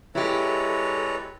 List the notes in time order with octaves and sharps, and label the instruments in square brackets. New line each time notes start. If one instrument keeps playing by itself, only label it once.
[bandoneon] G#3 B4 C#5 [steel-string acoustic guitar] E4 G4 [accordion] A4 D5 A#5